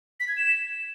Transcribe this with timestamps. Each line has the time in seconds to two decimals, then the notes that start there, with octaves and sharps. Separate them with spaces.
0.20 B6
0.28 G#6
0.37 E7